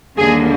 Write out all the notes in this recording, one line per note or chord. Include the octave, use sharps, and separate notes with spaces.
D#2 D3 G3 A#3 G#4